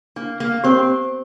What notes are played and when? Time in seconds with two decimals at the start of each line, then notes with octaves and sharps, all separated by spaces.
0.16 A#3 D4
0.40 A#3
0.64 C4 G4 C5